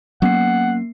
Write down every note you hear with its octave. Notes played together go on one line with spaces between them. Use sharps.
F#3 A#3 B3 C#4 F#5 C7